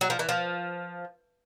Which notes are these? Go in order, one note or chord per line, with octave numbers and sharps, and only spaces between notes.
F#3
F3
E3
F3